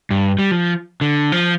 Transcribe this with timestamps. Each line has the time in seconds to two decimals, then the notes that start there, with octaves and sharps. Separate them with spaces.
0.10 G2
0.39 G3
0.51 F3
1.01 D3
1.32 F3